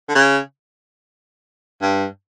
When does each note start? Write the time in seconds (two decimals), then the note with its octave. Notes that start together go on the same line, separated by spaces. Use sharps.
0.09 D3
0.15 C#3
1.82 G2